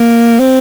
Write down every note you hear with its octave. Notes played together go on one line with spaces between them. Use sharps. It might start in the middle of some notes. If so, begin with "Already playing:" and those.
Already playing: A#3
C4